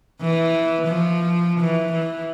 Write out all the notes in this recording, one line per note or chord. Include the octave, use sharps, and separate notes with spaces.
E3
F3
E3
E3